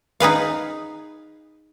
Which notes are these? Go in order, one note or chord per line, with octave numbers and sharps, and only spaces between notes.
D#4 G#4 B4 F5